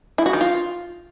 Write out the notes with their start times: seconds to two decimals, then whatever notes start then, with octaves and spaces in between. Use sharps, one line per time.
0.18 E4
0.26 F#4
0.33 D#3
0.41 F4